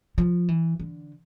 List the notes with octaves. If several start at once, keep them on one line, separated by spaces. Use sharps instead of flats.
F3
E3
D3